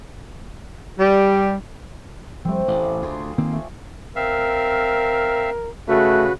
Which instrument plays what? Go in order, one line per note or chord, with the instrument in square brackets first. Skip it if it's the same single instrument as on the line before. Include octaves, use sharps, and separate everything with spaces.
[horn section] G3
[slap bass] F3 G3 [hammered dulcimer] A3 C4
[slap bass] A1 [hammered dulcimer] D5 F5 B5
[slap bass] D2 [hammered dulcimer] F4 G#4 C6
[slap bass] D#3 A#3 C4
[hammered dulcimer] A3
[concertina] C4 E5 F5 [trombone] A#4
[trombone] C#3 [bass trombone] A3 [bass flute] F#4 [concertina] B4